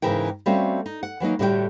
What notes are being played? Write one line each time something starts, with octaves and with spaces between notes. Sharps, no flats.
G#2 C#3 E3 A#4 G5
G3 A3 C4 C#4 F#4 F5
D#4
F#5
E3 F#3 A#3 D#4
A2 D3 G3 F#4 C5 G5